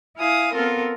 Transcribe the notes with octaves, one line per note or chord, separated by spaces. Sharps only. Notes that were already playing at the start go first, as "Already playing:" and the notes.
E4 F5 G#5 D#6
B3 C4 F4 A4 A#4